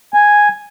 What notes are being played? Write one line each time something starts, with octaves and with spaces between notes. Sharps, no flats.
G#5